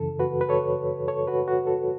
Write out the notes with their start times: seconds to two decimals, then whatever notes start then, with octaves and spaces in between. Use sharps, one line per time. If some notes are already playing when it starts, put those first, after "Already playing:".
Already playing: F#2 C#3 E3 A4
0.19 F#4 B4
0.41 B4
0.49 A4 C#5
1.08 A4 C#5
1.27 F#4 B4
1.48 F#4
1.67 A4